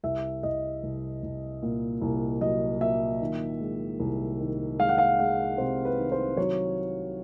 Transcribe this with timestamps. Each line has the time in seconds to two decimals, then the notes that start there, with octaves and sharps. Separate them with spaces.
0.03 C2 E5
0.43 C2 D#5
0.83 C2
1.23 C2
1.62 A#2
2.02 C2
2.41 F#3 D#5
2.81 A#2 E5
3.21 D#3
3.61 G#3
4.00 C2
4.40 D#3
4.79 G#3 F5
4.89 F#5
4.98 F5
5.19 G#3 F#5
5.58 C3 C5
5.85 B4
5.98 D#3
6.12 C5
6.37 F#3 C#5